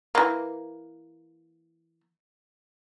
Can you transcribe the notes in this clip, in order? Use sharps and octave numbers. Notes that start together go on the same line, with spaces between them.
E3 A#3